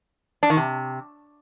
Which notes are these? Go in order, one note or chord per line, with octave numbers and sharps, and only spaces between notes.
D4
D#3
C3